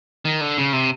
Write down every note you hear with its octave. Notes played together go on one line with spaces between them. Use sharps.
D#3
D3
C#3
C3